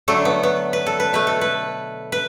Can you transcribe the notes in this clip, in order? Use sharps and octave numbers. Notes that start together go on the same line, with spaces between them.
D3 F#3 A3 A4
B3
B3
B4
A4
B4
B2 A3 B4
A4
B4
B4